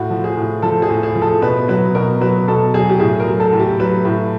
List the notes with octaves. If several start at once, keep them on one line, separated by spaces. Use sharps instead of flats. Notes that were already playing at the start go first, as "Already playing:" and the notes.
Already playing: A2 F#4
F3
G#4
A2
F3 A4
G#4
A2
G#4
F3
A4
B2 B4
F#3 B4
B2 A#4
F#3 B4
B2 A4
F#3 G#4
G4
A2 G#4
A#4
F#3
A4
A2
G4
F#3 B4
A2